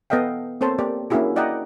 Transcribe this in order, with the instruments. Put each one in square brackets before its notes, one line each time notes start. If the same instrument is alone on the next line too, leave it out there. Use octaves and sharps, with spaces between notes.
[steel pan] B3 A4 D#5 F5 G5
A#3 C4 A4 C5 C#5 A5
A#3 G4 D5
A#3 C#4 D4 E4 F#4 G#4
E4 D5 D#5 F#5 G5 A#5